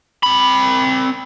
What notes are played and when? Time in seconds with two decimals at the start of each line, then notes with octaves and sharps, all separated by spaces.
0.23 C4 B5